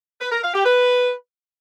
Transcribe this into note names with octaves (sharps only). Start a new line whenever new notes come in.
B4
A#4
F5
G4
B4